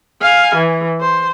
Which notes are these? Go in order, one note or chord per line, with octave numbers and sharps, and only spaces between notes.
F5 G#5
E3
C5